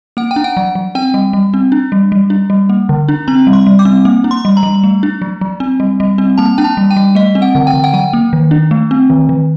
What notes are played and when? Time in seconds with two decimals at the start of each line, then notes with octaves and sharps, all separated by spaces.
0.17 A#3 F#5
0.31 G5
0.36 D4
0.44 F#5
0.57 F#3
0.75 F#3
0.95 C4 G5
1.14 G3
1.33 G3
1.54 C4
1.72 D4
1.92 G3
2.12 G3
2.30 D4
2.50 G3
2.70 A#3
2.89 D3
3.09 D4
3.28 C4 A#5
3.47 G3
3.53 C6
3.67 G3
3.79 D6
3.85 C4
4.05 A#3
4.24 D4
4.31 C6
4.45 G3
4.57 A#5
4.63 G3
4.84 A3
5.03 D4
5.22 F#3
5.41 F#3
5.60 C4
5.80 G3
6.00 G3
6.18 C4
6.38 A#3 A5
6.58 D4 G5
6.64 A5
6.77 G3
6.91 G5
6.97 G3
7.15 A3 D#5
7.35 C4
7.42 F#5
7.55 D3
7.67 G5
7.74 D3
7.84 F#5
7.94 F#3 G5
8.13 A#3
8.33 D#3
8.51 D4
8.71 A3
8.91 C4
9.10 D#3
9.29 D#3